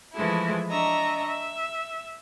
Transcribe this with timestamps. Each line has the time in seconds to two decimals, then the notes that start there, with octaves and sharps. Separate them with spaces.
0.14 E3 F3 G#3 A3 E4
0.70 D4 D#5 E5 A#5 C#6
1.28 E5